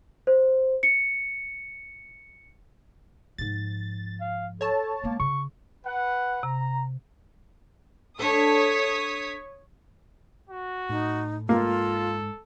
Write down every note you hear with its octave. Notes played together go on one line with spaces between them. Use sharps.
C5
C#7
G#2 F3 A6
F5
A4 C#5 A5
G#3 A#3 B3
C#3 C#6
B4 F#5
C3 A#5
D4 A4 C#5 D#6 B6
F#4
A2 D#4
G#2 A#3 F4 A4